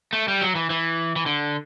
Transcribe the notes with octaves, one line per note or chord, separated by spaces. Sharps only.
A3
G3
F#3
E3
E3
E3
D3